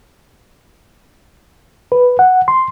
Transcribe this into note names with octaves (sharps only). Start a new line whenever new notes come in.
B4
F#5
C6